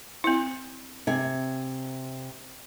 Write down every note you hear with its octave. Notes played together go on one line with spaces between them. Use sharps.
C4 E4
C3 G#5